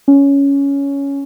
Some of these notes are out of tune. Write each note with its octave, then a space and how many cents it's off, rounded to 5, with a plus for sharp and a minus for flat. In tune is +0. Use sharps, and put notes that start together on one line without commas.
C#4 +10